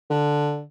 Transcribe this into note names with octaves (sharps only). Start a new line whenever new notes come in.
D3